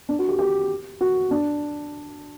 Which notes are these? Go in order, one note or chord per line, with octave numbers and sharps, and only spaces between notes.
D4
F#4
G4
G4
F#4
D4